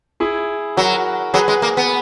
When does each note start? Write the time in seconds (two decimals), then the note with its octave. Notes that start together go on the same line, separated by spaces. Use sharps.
0.20 E4 G#4
0.77 F#3 F#4 A#4
1.34 F#3 G#4 B4
1.48 G#3
1.62 A#3
1.77 B3